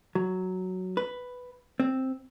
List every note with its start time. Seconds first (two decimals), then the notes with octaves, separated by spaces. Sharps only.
0.15 F#3
0.97 B4
1.80 C4